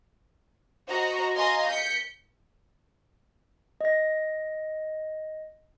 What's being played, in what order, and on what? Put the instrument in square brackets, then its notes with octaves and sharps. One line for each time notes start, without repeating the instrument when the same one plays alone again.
[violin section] F#4 C5 D#5 A#5
D#5 F5 G#5 A#5 C6
G6 B6 C#7
[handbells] D#5 A#6